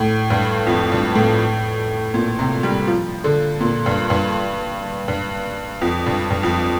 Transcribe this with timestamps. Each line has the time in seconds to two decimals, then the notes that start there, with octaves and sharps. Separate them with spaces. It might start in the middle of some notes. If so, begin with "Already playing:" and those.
Already playing: A2
0.30 G2
0.67 F2
0.92 G2
1.15 A2
2.14 A#2
2.39 C3
2.63 G3
2.88 F3
3.24 D3
3.61 A#2
3.86 G2
4.10 G2
5.08 G2
5.81 F2
6.06 G2
6.30 G2
6.43 F2